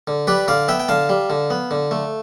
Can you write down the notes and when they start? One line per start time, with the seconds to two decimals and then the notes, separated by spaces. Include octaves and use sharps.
0.07 D3
0.27 G3 B4 D5
0.48 D3 D5 F5
0.68 B3 E5 G5
0.80 G5
0.88 D3 F5 A5
1.09 G3
1.30 D3
1.50 B3
1.71 D3
1.91 A3